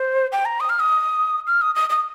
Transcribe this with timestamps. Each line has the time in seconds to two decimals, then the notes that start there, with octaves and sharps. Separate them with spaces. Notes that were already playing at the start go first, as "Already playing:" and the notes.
Already playing: C5
0.32 G5
0.45 A#5
0.60 D#6
0.69 F6
0.80 D#6
1.47 F6
1.61 D#6
1.75 D#6
1.90 D#6